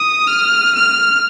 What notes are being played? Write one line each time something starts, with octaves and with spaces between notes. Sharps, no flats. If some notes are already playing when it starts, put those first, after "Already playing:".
Already playing: D#6
F6
F6